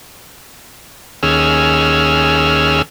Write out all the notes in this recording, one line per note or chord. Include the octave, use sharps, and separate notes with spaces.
D#2 C#4 G#4 E6 F6